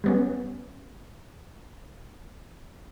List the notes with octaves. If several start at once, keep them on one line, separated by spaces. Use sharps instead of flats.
G3 B3 C#4